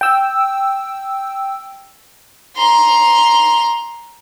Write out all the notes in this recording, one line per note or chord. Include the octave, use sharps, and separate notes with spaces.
G5 E6
A#5 C6